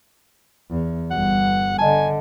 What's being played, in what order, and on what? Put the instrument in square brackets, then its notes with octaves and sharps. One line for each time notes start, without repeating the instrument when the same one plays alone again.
[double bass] E2
[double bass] G1 G2 [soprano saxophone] F#5
[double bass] D3 [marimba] D#5 A5 [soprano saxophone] G#5